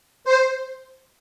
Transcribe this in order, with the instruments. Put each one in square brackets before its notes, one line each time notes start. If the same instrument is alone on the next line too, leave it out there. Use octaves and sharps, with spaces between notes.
[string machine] C5